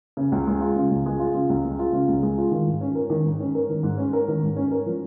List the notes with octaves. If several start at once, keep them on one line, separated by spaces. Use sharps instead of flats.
C#3
C#2
G#3
F4
C#3
C#2
G#3
F4
C#3
C#2
G#3
F4
C#3
C#2
G#3
F4
D#3
G#2
C#4
A#4
D#3
G#2
C#4
A#4
D#3
G#2
C#4
A#4
D#3
G#2
C#4
A#4
F3